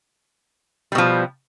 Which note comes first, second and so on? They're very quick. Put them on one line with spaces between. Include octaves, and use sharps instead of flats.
G3 B2 F3